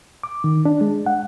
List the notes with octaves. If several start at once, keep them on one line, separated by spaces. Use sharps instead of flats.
D6
D#3
D4
G#3
F#5